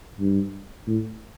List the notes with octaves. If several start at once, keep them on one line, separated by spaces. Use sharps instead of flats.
G2
A2